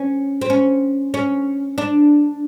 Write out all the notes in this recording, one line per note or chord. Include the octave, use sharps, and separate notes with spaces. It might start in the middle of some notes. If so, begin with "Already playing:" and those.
Already playing: C#4
C4
C#4
C#4
D4